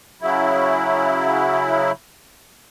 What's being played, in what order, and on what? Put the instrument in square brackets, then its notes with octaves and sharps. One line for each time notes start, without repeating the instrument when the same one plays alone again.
[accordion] C#3 F#3 E4